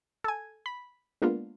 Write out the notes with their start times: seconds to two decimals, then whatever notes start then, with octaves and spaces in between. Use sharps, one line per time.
0.24 A4 G#5
0.66 B5
1.22 G#3 A#3 B3 D4 F4